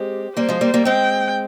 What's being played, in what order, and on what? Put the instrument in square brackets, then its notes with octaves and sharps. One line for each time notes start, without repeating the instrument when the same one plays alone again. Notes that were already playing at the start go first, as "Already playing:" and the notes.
Already playing: [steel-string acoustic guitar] G#3 C4 [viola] G4
[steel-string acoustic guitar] G3 A#3 [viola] C5
[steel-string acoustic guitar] F3 G#3
G3 A#3
G3 A#3
[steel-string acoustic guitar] G#3 C4 [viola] G5